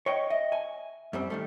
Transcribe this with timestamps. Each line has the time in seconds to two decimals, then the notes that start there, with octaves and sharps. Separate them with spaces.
0.06 C#5 D#5 G5
0.30 D#5 E5
0.52 G#5
1.13 F#2 G3 C4
1.30 D#3 G3 A3